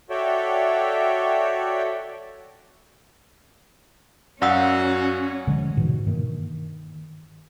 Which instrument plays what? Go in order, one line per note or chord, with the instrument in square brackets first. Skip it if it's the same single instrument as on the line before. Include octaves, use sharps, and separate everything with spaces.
[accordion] F#4 A4 C#5 D5 E5 G5
[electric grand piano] F#2 F5 [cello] C#4 [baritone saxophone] F#4 [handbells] D5 F#5 E6
[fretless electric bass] D3 F3 G#3
G#2 B2 E3
G2 D#3 A#3